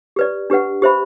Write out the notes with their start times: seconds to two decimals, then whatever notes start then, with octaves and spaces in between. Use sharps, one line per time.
0.16 G4 B4 D5
0.50 D4 G4 B4 F#5
0.82 G4 C5 E5 B5